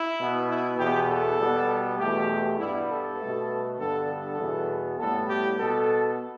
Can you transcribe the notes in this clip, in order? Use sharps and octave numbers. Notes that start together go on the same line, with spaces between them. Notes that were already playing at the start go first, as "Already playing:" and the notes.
Already playing: E4
B2 B3
E4
E2 B2 B3 G4
A4
B2 G3 B3
E2 B2 A3 G4
G2 G3 B3 E4
A4
B2 A3
G2 D3 G3 B3 A4
A4
E2 B2 B3
A2 G3 B3 A4
G4
B2 B3 A4